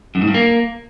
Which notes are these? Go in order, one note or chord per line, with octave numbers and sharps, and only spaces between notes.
F#2
G#2
G2
A#3